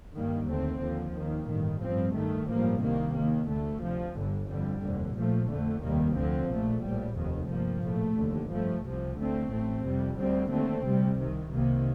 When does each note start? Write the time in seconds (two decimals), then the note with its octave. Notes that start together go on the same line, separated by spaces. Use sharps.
0.15 G2 D#3 G3 A#3
0.48 D#2 D3 A3 C4
0.81 D#2 D3 F3
1.14 D#2 D#3 A#3
1.48 A1 G2 D#3
1.82 G2 F3 C4
2.15 G2 D#3 A3
2.48 A1 G2 F3 A#3
2.82 C2 C3 D#3 A#3
3.15 D#2 D#3 A#3
3.49 D2 D3 A3
3.82 D2 C3 F3
4.16 G1 G2 D3
4.49 F2 D3 G3
4.83 F1 D#2 D3
5.16 A#1 A#2 F3 A3
5.49 F2 D3 A3
5.83 F1 D#2 D#3 G3 A#3
6.17 D2 D3 F3 C4
6.50 A#1 A#2 A3
6.83 A#1 A2 G3
7.16 F1 D#2 D#3
7.50 G2 F3 A#3
7.84 A#1 A2 A3
8.17 F1 D#2 D3
8.51 G2 F3 A3
8.84 C2 C3 F3
9.18 D2 D3 A3 C4
9.51 A1 A2 A3 C4
9.84 F2 C3 G3
10.18 D2 D3 G3 C4
10.51 D#2 D3 A3 C4
10.85 D2 C3 G3
11.18 C2 C3 D#3
11.52 C2 C3 D#3 A#3